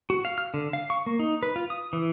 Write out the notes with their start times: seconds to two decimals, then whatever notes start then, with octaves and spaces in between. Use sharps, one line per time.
0.10 F#4
0.25 F5
0.38 F6
0.54 D3
0.73 F5
0.90 C#6
1.06 A#3
1.19 D#4
1.43 B4
1.56 F4
1.70 D#6
1.93 E3